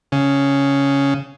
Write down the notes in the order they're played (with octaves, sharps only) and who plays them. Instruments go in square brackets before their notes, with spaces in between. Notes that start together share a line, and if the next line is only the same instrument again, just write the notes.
[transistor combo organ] C#3